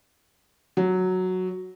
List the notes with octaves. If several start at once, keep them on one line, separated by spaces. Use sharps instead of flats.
F#3